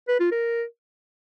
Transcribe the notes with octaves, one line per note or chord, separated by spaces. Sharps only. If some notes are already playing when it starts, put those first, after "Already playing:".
B4
F4
A#4